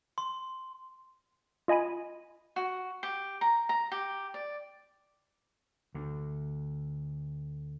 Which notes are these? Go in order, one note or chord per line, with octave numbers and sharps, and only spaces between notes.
C6
F4 D#5 G#5 B5 D#7
F#4
G4
A#5
A#5
G4
D5
D2 D3